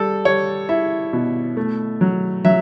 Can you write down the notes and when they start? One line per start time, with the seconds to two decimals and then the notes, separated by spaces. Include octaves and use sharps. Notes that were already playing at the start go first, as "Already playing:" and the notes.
Already playing: G3 A4
0.25 G3 C#5
0.69 E4 E5
1.13 B2
1.57 A3
2.01 F#3
2.45 F#3 E5